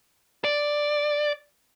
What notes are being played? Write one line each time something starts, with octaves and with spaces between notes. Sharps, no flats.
D5